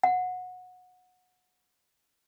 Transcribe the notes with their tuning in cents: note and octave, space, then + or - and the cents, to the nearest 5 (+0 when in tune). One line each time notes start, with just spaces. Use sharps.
F#5 -20